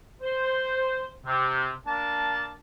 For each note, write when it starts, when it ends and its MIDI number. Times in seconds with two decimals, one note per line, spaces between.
0.22 1.11 72
1.26 1.70 48
1.87 2.52 58
1.87 2.52 62
1.87 2.52 81